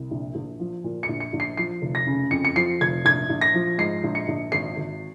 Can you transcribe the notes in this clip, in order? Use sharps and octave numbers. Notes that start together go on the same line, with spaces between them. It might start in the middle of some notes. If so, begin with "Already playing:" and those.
Already playing: C2
A#1
A#1
F3
A#2
C#7
A#1
C#7
A#1
C7
F3 C7
F1
A#6
C#3
F2 C#7
C#7
F3 C7
F1 G#6
A#1 G#6
A#1
A#6
F3
G#2 C7
A#1
C#7
A#1
G#1 C7
G#1